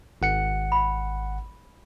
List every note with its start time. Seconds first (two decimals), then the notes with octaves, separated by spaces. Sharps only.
0.22 G#1 F#5 C#7
0.72 B5